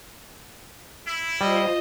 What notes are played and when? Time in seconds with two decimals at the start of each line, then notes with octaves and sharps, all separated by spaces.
1.06 E4
1.41 G3 F4 C5 D#5